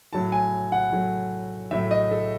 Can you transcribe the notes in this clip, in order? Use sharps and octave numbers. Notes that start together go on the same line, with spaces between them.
A2 F#3 A3 A5
G#5
F#5
A2 F#3 A3
A2 F#3 A3 E5
D#5
A4